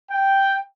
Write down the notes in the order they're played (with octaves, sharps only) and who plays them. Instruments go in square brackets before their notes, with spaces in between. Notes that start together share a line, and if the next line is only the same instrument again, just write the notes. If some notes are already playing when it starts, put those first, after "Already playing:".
[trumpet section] G5